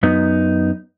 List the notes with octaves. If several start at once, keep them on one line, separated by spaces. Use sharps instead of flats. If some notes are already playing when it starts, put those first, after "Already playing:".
F#2 B3 D#4